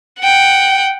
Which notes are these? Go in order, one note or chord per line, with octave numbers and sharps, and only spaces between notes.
F#5 G5